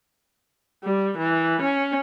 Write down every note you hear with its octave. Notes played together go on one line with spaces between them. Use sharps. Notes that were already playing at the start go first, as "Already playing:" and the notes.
G3
E3
C#4